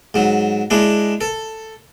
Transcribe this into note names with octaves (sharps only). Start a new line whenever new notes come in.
G#2 F#3
G#3 D4 E4
A4